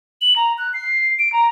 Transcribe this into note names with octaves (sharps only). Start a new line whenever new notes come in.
F#7
A#5
F#6
C7
D7
A#5